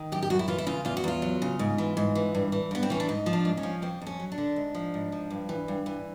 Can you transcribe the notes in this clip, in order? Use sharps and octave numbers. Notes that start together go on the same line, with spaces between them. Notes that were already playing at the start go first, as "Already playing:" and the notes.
Already playing: D#3
F#2 G4
G4
F#2 F#4
E4
E3 F4
E4
C#3 F4
E2 F4
F#4
E2 F4
F#3
C#3
G#2
E3
G#2
E3
G2
E3
G2 B3
C4
E3 C#4
D4
G#2 D#4
F3
D4
G#2
C#4
F3
F2 C4
F2 C#4
F#3
D4
D3
G#2
F3
G#2
F3
G2
E3
G2
E3